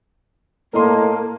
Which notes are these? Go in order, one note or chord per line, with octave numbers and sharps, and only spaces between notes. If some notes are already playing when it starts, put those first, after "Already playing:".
A2 A#3 A4 A#4 D#5 C6